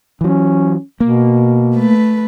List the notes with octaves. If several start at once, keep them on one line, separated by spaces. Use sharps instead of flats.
E3 F#3 C#4
B2 A#3
A3 B4